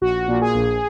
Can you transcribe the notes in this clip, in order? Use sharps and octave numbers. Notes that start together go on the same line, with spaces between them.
A#1 F#4
A#2
G#4
A#1